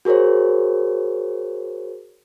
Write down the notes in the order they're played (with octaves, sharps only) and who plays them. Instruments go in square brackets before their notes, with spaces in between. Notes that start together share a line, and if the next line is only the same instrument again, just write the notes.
[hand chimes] F#4 G#4 A#4 C5 C#5